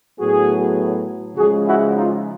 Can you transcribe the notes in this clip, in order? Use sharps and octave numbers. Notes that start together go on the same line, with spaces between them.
A2 F#3 B3 F#4 G#4
C#3 F3 G#3 F#4 G#4
E4 F#4
D#4 F4